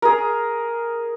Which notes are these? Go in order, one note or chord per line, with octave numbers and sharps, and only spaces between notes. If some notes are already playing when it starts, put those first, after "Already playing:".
G#4 A#4